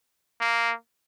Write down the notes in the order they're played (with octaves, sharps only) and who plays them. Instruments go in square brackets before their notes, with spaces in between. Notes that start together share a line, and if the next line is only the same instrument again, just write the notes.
[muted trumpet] A#3